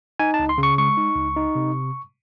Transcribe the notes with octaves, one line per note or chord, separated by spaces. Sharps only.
D#4 G#5
A5
C#2
C6
C#3
C#6
G#3 C#6
D#4
C#2
D#4
C3